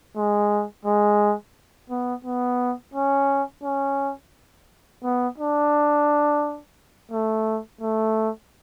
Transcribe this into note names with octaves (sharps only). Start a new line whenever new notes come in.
G#3
G#3
B3
B3
C#4
C#4
B3
D4
A3
A3